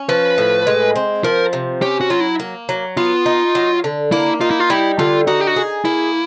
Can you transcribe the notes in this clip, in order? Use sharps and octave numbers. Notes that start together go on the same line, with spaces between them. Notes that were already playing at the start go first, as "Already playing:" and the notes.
Already playing: C#4
F3 B4
A2
G#3
C4
F3 A#4
C3
C#4 G4
F#4
F#3 F4
E4
A#3
F#3
B3 F4
D#4
F#3
D3
A#3 E4
D#4 F4
E4
F4
G3 E4
D3 F4
D#4 F#4
G4
F#4
G#4
A#3 E4